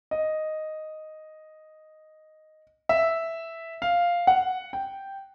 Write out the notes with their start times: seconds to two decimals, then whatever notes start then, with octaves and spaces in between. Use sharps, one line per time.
0.11 D#5
2.89 E5
3.82 F5
4.27 F#5
4.73 G5